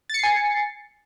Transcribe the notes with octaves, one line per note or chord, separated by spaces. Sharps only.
G#5 A6 C7 C#7